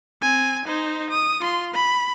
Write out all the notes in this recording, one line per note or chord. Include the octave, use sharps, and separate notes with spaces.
C4 G#5
D#4 C5
D#6
F4 C6
B5